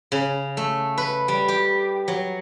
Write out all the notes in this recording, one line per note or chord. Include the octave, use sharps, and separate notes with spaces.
C#3
A3
B4
G3
G4
F#3